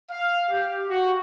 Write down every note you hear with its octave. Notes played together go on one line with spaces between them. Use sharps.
F5
G4
F#4